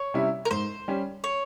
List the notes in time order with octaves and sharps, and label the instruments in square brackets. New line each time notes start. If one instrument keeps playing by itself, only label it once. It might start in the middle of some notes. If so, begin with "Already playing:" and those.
Already playing: [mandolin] C#5
[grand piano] C3 G3 C#4 E4
[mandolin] A#4
[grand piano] G#2 [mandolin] C5
[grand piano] G3 C#4
[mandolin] C#5